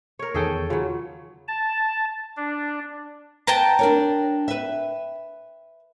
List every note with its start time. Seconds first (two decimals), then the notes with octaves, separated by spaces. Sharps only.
0.19 A#4 C#5
0.34 E2 D#3 G#4 A4 C#5 G5
0.70 C#3 F#3 F4
1.48 A5
2.37 D4
3.47 B4 G5 A5 A#5
3.79 D4 A#4 C#5
4.48 B4 E5